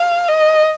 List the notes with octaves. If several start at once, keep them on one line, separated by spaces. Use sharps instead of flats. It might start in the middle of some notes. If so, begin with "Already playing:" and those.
Already playing: F5
D#5